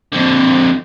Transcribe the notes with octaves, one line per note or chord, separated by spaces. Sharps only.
F2 D3